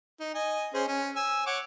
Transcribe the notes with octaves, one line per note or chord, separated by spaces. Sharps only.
D#4
D#5 G#5
C#4 G#4 C5
C#4
G#5 E6
C#5 F#5 D6